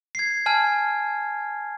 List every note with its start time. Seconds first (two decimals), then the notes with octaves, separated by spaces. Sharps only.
0.15 G#6 C7
0.46 G#5 A5 F6 G#6